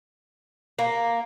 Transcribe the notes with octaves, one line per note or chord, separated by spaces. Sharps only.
A#3